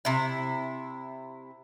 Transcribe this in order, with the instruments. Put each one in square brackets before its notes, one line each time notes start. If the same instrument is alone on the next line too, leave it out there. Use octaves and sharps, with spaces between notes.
[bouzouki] C3 E4